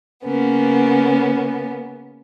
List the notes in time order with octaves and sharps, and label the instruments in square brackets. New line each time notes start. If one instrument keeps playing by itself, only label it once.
[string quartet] C#3 A#3 B3 C#4